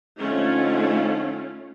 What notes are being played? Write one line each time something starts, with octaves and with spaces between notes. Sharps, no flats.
F2 D3 A3 C#4 D#4 F4